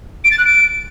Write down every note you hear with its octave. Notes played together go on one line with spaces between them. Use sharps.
D7
A6
F#6
D7